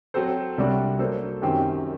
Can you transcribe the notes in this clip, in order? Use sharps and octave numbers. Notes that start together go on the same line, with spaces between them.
F#3 C4 F#4 A4 C5
C2 C3 G3 D4 F#4
F#3 A#3 D4 A4 C5
F#2 D#3 F#3 C4 G4